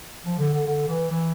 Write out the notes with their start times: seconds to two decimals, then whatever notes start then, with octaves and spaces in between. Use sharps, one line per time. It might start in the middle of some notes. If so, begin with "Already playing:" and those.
0.25 F3
0.38 D3
0.53 D3
0.67 D3
0.88 E3
1.10 E3